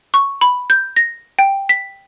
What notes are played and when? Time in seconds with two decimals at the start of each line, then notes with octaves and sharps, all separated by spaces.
0.14 C#6
0.41 B5
0.70 G6
0.96 A#6
1.39 G5
1.69 B6